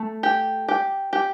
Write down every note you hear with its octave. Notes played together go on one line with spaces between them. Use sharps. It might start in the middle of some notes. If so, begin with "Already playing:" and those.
Already playing: A3
G4
G4
G4